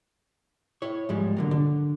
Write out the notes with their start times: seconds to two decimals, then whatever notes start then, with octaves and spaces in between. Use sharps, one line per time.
0.82 E4 C#5
1.09 G#2 F3 G3 G#3
1.37 D3 F#3 A#3
1.51 D3